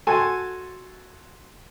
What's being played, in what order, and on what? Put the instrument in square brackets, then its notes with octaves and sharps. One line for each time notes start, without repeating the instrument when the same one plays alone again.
[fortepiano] F#4 A4 G#5 A5 C6